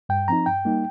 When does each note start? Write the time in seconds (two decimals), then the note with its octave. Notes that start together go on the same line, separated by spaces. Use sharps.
0.09 G2 G5
0.28 F3 C4 D#4 A#5
0.46 G2 G5
0.65 G3 A#3 D#4